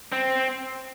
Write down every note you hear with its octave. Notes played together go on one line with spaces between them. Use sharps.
C4